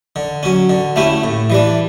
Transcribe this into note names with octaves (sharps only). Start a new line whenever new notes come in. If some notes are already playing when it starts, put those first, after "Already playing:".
D3
F#3 C#4
D3
A3 C#4 E4 G4
A2
E3 G3 D4